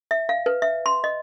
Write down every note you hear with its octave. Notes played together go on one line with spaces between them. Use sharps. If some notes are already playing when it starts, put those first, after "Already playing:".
E5
F5
B4
E5
C6
D#5